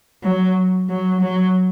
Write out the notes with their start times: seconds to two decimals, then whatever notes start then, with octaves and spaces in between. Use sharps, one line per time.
0.24 F#3
0.90 F#3
1.21 F#3